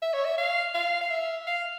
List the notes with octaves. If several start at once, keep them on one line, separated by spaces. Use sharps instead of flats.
E5
C#5
E5
F5
F5
F5
E5
F5